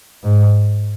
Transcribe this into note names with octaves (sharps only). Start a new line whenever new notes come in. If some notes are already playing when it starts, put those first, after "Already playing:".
G#2